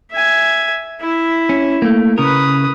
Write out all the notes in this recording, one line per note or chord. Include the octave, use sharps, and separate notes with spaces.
E5 G#5
E4 E5
C#4
A3 A#3
C#3 A#4 B4 D#6